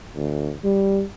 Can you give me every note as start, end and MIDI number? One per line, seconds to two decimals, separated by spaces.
0.16 0.51 38
0.64 1.02 55